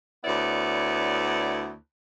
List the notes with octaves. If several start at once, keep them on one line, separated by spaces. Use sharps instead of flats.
D2 B3 E4 C#5 D5